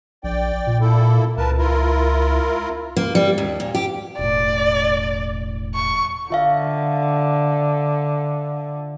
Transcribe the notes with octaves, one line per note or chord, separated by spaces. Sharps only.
A#1 D5 G5
A#2
A#3 E4 A4
C#2 A#4 B4 A5
E4 F4 A#4
A#3
G3
D#2
A#2
G4
E1 A2 D5
C#6
D3 F4 E5 F5